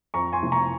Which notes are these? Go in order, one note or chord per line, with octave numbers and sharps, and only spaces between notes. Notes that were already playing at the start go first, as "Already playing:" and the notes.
F2 A#5 C#6
G#5 C6
F1
A#5 C#6